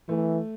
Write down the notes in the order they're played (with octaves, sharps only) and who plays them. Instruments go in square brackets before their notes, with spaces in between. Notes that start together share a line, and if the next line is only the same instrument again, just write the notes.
[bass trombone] E3 [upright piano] A3